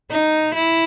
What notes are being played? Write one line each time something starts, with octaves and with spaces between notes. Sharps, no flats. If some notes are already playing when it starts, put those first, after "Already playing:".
D#4
E4